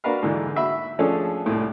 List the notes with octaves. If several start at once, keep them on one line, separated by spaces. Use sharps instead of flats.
D4 F#4 A#4 B4 F5
G#2 D3 E3
F#4 E5 B5
F3 A3 C#4 D4 G#4 A4
C2 A2